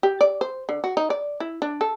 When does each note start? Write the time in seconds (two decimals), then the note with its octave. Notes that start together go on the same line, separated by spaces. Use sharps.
0.03 G4
0.21 D5
0.41 C5
0.69 D3
0.84 F#4
0.97 D#4
1.10 D5
1.40 E4
1.62 D4
1.81 A4